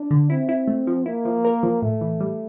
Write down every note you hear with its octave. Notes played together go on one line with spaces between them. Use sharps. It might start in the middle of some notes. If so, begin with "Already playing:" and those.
Already playing: D4
D3
C4 E4
E4
A3
F3
A#3 E4
F3
A#4
F3
A2 A3
E3
G3